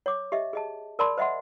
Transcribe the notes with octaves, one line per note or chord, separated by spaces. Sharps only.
C#5 D6
G4 D#5 E5
G#4 D#5 A5
A#4 D5 A5 B5 C6
C5 D#5 E5 F#5 C6